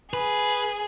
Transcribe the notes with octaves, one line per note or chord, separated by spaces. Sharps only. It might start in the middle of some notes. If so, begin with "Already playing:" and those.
G#4 B4